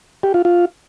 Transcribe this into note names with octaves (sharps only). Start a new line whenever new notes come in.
G4
F4
F4